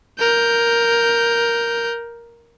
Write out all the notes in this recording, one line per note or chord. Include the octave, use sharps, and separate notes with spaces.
A#4 G6